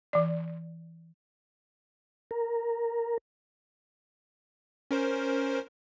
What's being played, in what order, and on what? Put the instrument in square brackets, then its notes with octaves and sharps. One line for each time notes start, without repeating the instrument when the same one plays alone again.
[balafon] E3 D5
[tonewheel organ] A#4
[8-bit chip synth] C#4 A#4 C5